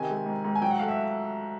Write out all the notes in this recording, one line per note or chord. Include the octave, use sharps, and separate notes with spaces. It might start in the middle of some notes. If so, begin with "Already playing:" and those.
Already playing: C3 D#3 G#5
G#3
G#2
G#2
G#5
F#3 G5
F#5
A3 F5
E5